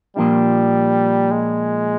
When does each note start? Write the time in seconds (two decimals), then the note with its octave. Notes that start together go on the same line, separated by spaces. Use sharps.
0.16 A#2 F3 G3 A#3 D4
1.31 G#3